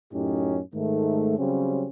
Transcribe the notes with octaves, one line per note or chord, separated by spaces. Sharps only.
F#2 A2 C#4 D#4 G4
G#2 D#3 A3
C#3 F#3 G3 C4 C#4